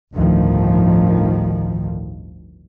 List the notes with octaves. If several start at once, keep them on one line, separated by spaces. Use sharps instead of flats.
G1 D2 A2 D#3 F3